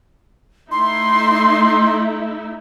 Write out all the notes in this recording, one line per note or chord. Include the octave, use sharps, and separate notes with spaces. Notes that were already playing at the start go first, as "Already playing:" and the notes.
A3 D#4 E4 C6